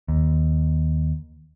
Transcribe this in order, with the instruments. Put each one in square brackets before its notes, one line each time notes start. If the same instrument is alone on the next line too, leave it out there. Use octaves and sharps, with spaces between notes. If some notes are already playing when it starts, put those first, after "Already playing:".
[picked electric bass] D#2